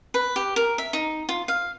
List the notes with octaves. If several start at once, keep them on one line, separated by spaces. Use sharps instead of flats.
B4
G4
A#4
E5
D#4
F4
F5